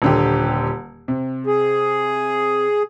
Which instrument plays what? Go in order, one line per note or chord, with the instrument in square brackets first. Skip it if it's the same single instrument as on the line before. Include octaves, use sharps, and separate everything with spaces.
[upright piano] D#1 D3 G4
C3
[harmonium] G#4